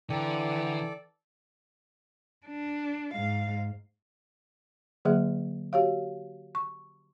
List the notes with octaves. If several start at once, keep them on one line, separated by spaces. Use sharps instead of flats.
D3 E3 A4 D5 G5 A#5
D4
G#2 F5
D3 F#3 A#3 G#4 E5 F#5
F#4 G4 C#5 F5
C#6